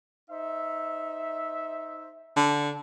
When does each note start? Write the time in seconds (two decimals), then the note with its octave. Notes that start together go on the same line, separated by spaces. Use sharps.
0.30 D#4 C5 E5
2.36 D3